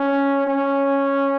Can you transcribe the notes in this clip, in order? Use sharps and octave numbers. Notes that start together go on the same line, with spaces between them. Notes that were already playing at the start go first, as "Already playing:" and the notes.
Already playing: C#4
C#4